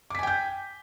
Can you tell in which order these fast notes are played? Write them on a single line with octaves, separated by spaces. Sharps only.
D6 B6 G#5 G5 G6